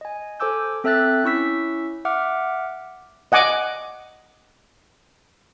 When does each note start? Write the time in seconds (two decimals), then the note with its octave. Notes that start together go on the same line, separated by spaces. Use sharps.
0.01 D#5 G#5
0.40 A4 C5 G#5 D6 E6 G6
0.84 C4 A4 E5 E6 F#6 A6
1.24 C#4 E4 C#6 E6 B6
2.05 E5 F#5 D6 F6
3.32 D#5 F#5 G#5 D6